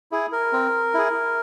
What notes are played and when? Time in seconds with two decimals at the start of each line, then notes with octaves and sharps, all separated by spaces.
0.12 E4 G#4
0.32 A#4
0.53 C4
0.94 E4 G#4